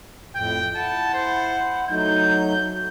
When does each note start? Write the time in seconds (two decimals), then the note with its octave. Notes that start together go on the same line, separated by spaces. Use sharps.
0.35 F2 A2 G5
0.75 E4 F#5 A5
1.13 C5
1.90 F#3 A3 D#4 G6